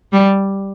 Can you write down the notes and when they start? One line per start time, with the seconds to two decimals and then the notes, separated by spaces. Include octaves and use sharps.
0.13 G3